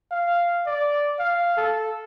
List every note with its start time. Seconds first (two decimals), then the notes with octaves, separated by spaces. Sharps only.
0.11 F5
0.66 D5
1.19 F5
1.57 A4